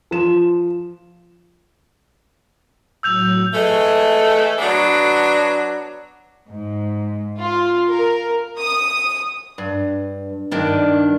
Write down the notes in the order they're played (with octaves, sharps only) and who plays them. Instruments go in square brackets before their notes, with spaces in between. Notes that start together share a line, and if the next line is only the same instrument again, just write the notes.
[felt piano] F3 E7
[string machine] A2 F#3 [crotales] E6 G6 F7
[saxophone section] E3 G#3 A3
F#3 B3 D4
[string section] G#2
F4
A#4
D#6
[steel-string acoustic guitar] G2
G2 D#3 D4